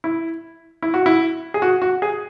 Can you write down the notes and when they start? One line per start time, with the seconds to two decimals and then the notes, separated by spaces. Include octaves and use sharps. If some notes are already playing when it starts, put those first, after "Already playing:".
0.04 E4
0.82 E4
0.94 F#4
1.06 E4
1.54 G#4
1.62 F#4
1.82 F#4
2.02 G#4